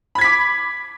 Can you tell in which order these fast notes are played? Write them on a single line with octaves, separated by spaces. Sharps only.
B5 G#6 B6 D6